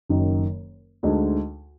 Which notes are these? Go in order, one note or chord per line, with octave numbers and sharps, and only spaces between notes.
F#1 F#2 D#3
D2 D3 G#3 D#4